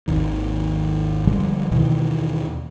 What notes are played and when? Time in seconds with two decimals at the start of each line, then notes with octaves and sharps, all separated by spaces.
0.08 G#1 D#2 D#3
1.27 D3 F3 G3 G#3
1.71 D#2 B2 D#3 E3